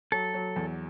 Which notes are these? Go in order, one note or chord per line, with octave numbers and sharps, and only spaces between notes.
F#3 A4
F#3
E2